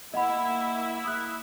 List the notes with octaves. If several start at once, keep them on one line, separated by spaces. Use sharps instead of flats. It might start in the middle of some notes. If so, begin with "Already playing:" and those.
A#3 E4 D#5 E5 F#5 B5
D#6 F#6